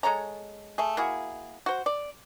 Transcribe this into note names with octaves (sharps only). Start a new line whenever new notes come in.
G#3 A4 C#5 A#5
A3 G#4
A#3 E4 F#4 G#4
F#4 C5
D5